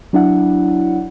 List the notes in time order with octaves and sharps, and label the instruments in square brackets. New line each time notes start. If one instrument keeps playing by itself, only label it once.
[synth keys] F#3 D4 E4 F#5